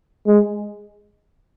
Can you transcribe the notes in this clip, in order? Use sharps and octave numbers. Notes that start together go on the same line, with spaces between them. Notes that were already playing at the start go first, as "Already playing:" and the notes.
G#3